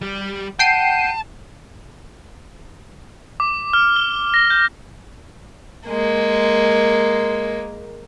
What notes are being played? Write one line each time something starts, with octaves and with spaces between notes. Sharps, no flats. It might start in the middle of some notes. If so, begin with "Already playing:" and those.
G3 G4
F#5 G5 A5 C7 D#7
D6
F6
G7
A#6
G6
G#3 A#3